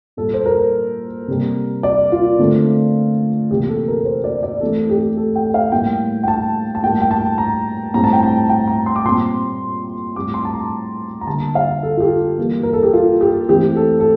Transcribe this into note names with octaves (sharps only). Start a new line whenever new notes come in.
A#2 G3 A#3 A4
C5
A#4
C3 G3 A#3
D5
F4
D3 A3 C4
C3 E3 A#3 G4
A4
A#4
C5
D5
D5
E3 A3 C4 A4
G4
A4
G5
F5
A2 G3 A#3 G5
G5
A5
A5
A2 G3 A#3 G5
G5
A5
A#5
A2 G3 C4 A#5
A5
G5
A5
G5
A#5
C6
D6
A#2 G3 C4 C6
A2 G3 C4 D6
C6
A5
A#5
A#5
D3 G3 A#3 A5
F5
A4
F4
G4
E3 G3 A#3
A#4
A4
G4
F4
G4
E3 A3 C4 G4
A4
A4